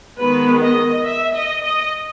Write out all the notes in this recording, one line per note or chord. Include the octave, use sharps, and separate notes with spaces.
D#3 G#3 B3 B4
D#5
E5
D#5
D#5